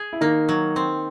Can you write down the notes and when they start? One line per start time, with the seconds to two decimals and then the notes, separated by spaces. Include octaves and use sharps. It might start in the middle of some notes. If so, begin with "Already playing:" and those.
Already playing: G#4
0.13 E4
0.21 D#3 A#3 D#4
0.49 F#3
0.76 C4